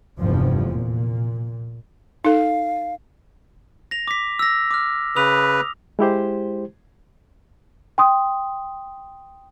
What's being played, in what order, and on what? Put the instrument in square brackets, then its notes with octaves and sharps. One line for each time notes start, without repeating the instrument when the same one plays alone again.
[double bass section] F1 E2 G2 F3
A#2
[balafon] D#4 A4 [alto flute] F5
[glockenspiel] A#6 F7
D6 B6
E6 A#6
D6 F6
[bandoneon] C#3 B4 [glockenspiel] D#6 F7
[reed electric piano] G#3 E4 G4 C5
[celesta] G5 C6 D#6